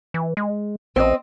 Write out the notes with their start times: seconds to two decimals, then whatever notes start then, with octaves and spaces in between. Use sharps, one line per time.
0.14 E3
0.37 G#3
0.96 A1 C4 D#5